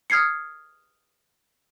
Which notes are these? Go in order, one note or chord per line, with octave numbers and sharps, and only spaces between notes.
D#6 F6 G#6 C7 C#7